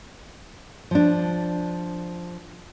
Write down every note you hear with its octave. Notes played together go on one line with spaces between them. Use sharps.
F3 D4